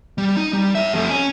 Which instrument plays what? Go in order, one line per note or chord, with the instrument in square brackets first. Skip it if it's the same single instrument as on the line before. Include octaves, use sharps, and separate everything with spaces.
[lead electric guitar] G3
D#4
G3
C#5 E5
F2 A3
C#4